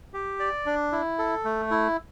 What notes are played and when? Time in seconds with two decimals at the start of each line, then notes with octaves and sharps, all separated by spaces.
0.14 G4
0.39 D5
0.66 D4
0.92 E4
1.19 A4
1.45 A3
1.71 E4